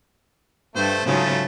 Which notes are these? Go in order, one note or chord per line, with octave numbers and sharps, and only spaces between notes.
G2 A3 C5
G#2 C#3 F3 F#3 A3